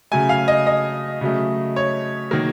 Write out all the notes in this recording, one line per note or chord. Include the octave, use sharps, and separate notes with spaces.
C#3 F#3 A3 G#5
F5
D#5
D#5
C#3 F#3 A3
C#5
D#3 F#3 A#3